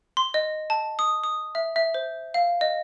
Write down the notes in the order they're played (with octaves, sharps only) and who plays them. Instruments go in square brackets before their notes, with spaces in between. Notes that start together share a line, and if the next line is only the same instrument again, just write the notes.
[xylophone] C6
D#5
A5
D#6
D#6
E5
E5
C5
F5
D#5